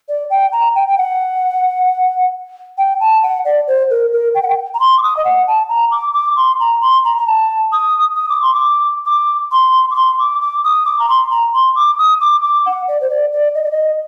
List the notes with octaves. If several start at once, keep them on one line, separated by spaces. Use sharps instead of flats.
D5
G5
A#5
G5
G5
F#5
G5
A5
F#5
D5
C5
A#4
A#4
G5
F#5
G5
A#5
C6
D6
D#6
D#5
F#5
A5
A#5
D6
D6
C6
A#5
C6
A#5
A#5
A5
D#6
D#6
D6
C6
D6
D6
C6
D6
C6
D6
D6
D#6
D6
A#5
C6
A#5
C6
D6
D#6
D6
D6
F#5
D5
C5
D5
D5
D#5
D5
D#5